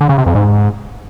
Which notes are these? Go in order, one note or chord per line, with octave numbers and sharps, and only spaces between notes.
D3
C#3
C3
F2
G#2